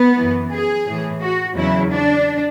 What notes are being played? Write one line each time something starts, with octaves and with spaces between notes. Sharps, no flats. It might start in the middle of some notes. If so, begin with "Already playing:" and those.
Already playing: B3
F#2 E3
G#4
A2 E3
F#4
E2 C#3 F#3 E4
D4